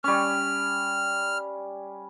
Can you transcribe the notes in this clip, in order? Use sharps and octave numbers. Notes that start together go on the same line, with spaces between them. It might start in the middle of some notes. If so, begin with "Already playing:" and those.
G3 C#4 F6